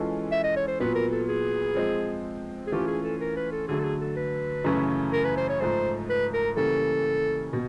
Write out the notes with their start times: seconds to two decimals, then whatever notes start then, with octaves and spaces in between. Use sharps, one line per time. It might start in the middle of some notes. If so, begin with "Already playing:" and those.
Already playing: E3 G#3 C#4 F4 A4
0.32 E5
0.44 D#5
0.56 C#5
0.68 C5
0.80 A#2 F#3 B3 B4
0.95 A#4
1.12 A4
1.28 G#4
1.75 F3 G#3 C4
2.67 G#4
2.72 E3 A3 C#4 F4 G4
2.88 G#4
3.04 A4
3.20 A#4
3.36 B4
3.52 A4
3.68 D3 F#3 A3 G#4
3.80 A4
3.84 G#4
4.01 A4
4.17 B4
4.64 F#2 C#3 E3 A3 C#4
5.13 A#4
5.24 B4
5.37 C5
5.49 C#5
5.60 G#2 F3 A3 C5
6.09 B4
6.33 A#4
6.56 C#3 E3 G3 A#3 C#4 A4
7.53 B2